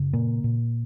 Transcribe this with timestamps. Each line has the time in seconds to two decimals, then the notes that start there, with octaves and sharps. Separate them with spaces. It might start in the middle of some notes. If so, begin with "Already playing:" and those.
Already playing: F#2 C#3
0.13 A#2 A#3
0.44 A#2